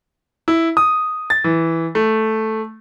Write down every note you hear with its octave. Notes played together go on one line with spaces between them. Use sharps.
E4
D#6
A6
E3
A3